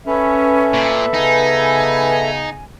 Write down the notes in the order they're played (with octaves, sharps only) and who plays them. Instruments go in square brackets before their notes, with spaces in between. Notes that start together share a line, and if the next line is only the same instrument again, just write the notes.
[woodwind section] C#4 [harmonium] A4 E5 [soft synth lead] B4
[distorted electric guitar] A#2
[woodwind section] C#3 B3 G#5 [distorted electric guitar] D#4